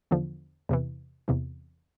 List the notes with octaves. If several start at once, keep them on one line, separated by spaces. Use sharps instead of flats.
E2 D3 F3
E2 C3 E3
E2 C3 E3